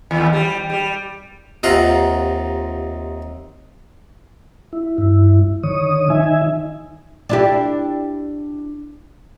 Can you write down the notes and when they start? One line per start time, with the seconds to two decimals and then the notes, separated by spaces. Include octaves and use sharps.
0.11 D#2
0.33 G3
0.70 G3
1.63 D#2 C3 D#4 F4 F#5 A#5
4.73 E4
4.98 G2 E4
5.63 D3 D#3 C#5 D#6
6.10 D#3 D#4 E5 G#5
7.29 D4 E4 G4